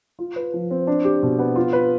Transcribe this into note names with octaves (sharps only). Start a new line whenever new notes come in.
F4
B4
F3
C4
D4
G4
B2
B3
F4
B4